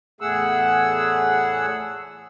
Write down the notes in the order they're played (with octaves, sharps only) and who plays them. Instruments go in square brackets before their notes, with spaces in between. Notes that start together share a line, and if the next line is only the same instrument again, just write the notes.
[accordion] E2 A2 A3 G#4 F#5 E6